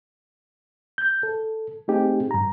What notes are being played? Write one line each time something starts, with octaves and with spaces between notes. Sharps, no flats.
G6
A4
A3 C4 D#4 G4 G#4
G2 A#5